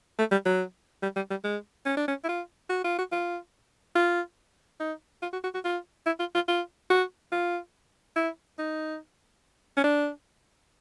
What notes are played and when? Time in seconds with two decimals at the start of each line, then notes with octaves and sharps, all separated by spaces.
0.18 A3
0.31 G3
0.45 F#3
1.03 G3
1.16 G3
1.30 G3
1.44 G#3
1.85 C#4
1.97 D4
2.08 C#4
2.24 E4
2.28 F4
2.69 F#4
2.84 F4
2.98 F#4
3.12 F4
3.95 F4
4.80 D#4
5.22 F4
5.33 F#4
5.44 F#4
5.54 F#4
5.65 F4
6.06 E4
6.20 F4
6.35 F4
6.48 F4
6.90 F#4
7.32 F4
8.16 E4
8.59 D#4
9.77 C#4
9.84 D4